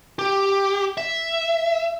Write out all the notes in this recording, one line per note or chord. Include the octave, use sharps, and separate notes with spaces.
G4
E5